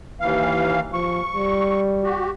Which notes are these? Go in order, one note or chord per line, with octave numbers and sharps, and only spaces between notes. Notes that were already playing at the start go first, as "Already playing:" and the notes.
D#2 E3 F5
F3 C#6
G3
F#4 G4